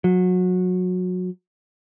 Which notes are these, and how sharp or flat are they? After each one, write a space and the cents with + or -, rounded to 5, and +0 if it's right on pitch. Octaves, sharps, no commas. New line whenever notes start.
F#3 -25